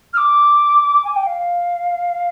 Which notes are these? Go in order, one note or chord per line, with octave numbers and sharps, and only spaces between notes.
F6
D6
G#5
G5
F5